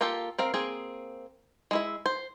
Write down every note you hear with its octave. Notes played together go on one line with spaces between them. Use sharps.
A#3 F4 G4 A4
C4 A#4 F5
A#3 C4 G#4
G#3 E4 E5
C5